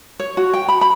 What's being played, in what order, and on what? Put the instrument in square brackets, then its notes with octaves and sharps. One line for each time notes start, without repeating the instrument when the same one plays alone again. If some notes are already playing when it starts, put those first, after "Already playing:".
[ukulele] C#5
F#4
G5
B5
B5